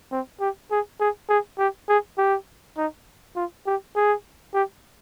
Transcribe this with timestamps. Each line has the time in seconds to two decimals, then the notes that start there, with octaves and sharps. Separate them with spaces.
0.12 C4
0.40 G4
0.71 G#4
1.00 G#4
1.29 G#4
1.58 G4
1.89 G#4
2.18 G4
2.77 D#4
3.36 F4
3.66 G4
3.96 G#4
4.54 G4